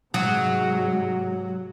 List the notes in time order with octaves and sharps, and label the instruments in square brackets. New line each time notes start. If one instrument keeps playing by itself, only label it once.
[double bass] G#2 C3 [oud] F#3